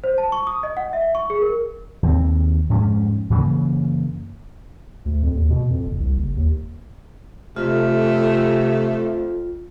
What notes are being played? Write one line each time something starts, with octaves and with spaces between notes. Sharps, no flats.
C5
A5
C#6
D#6
D#5
F#5
E5
C#6
G#4
A#4
D#2 C4
F2 G#2 C4 C#4
F#2 C#3 E3 A#3
D2
F2
D#2
B2
F2
F#1
C2
F#1
D#2
F2 C3 A3 F4